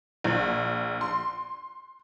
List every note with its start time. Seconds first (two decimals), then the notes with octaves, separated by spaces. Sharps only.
0.24 A#1
1.01 C6